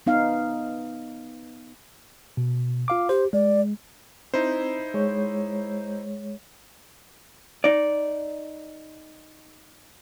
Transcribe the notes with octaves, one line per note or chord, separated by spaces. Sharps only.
B3 D#4 F5
B2
F4 F5 D6
G4 C5
G#3 D5
C4 D#4 E4 C5
G#3 C#5
D#4 D5